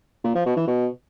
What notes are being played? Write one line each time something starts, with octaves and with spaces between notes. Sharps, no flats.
A#2
F3
B2
E3
B2